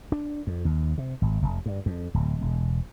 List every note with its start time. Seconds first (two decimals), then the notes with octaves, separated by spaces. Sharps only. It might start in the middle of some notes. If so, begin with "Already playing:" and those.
0.12 D4
0.47 F2
0.65 D#2
0.98 C3
1.22 G#1
1.42 F1
1.66 G2
1.86 F2
2.14 D1
2.41 E1